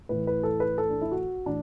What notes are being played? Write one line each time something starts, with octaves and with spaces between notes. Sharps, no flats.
A2 E3 B4
B4
A4
B4
A4
D4
E4
F#4
A2 E3 D4